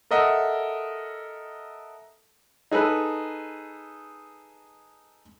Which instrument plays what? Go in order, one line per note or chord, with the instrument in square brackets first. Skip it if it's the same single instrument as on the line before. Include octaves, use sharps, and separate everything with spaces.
[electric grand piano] A4 A#4 D#5 E5 F#5
[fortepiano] D#4 G#4 A4 B4